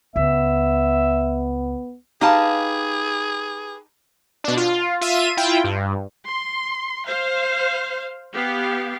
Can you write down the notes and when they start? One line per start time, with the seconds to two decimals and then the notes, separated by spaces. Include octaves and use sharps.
0.16 C#2 B3 E5
2.21 D#4 G4 G#4 B4 F5 A5
4.44 B2 D4
4.57 F4
5.01 F4 E5 D#7
5.37 E4 F4 G5
5.64 G2
6.27 C6
7.07 C5 F5
8.34 B3 G4 F5